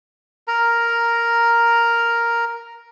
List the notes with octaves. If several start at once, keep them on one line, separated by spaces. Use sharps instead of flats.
A#4 A#5